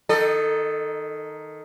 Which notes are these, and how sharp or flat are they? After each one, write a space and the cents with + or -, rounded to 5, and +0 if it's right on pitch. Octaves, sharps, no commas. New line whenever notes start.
D#3 +0 A4 +10 D#5 -35